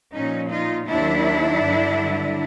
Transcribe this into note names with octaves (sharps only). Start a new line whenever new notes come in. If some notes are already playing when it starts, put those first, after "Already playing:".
A#2 F3 C#4 D#4
D#4 F4
D#2 D#3 F#3 D4 E4
G2 D3 F#3